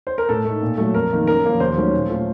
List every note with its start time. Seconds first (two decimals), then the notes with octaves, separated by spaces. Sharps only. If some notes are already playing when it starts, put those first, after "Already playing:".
0.07 C5
0.18 A#4
0.29 A2 A4
0.44 A3 D#4
0.62 A#2
0.77 F#3 A3
0.94 F2 A#4
1.12 D#3 A#3 D#4
1.27 F#2 A#4
1.44 F3 A#3 C#4
1.60 D#2 C5
1.77 D#3 F#3 A3 C#4
1.94 A#2
2.09 A3 C#4 F4